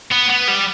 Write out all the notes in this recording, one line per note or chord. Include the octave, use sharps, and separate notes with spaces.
B3
B3
G3